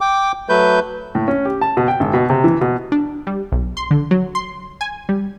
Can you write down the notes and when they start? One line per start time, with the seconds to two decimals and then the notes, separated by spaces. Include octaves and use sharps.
0.01 G5 D6
0.49 F#3 A3 B4 G6
1.15 A2
1.28 C#4
1.45 G4
1.61 A5
1.77 B2
1.88 G5
2.00 G#1
2.13 B2
2.30 C3
2.44 E3
2.61 B2
2.92 D4
3.27 G3
3.52 B1
3.77 C6
3.91 D3
4.11 F#3
4.35 C6
4.81 G#5
5.09 G3